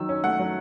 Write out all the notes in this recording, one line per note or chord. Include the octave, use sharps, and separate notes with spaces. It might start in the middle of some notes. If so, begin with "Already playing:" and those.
Already playing: D#3 F#3 E6
C#4
A3 F#5
F#3